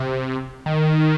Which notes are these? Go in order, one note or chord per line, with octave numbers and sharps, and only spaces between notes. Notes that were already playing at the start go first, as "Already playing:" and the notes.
Already playing: C3
D#3